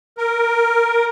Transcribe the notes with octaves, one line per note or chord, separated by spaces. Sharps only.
A#4